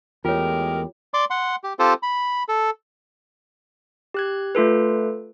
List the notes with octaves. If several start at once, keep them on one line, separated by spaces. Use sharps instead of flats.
E2 G#3 A3 F4 G4 A#4 C#5
D5 C6 D6
F#5 C6
G4
C4 F4 G4 A4 C5
B5
A4
G4 F#6 G#6
A3 F4 A4 B4